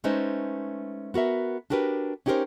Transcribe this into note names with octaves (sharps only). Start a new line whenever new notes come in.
G#3 A3 C#4 D#4 B4 C5
B3 F#4 A#4 E5
D4 F#4 G4 A#4 B4
C#4 D#4 G4 G#4 A#4 C5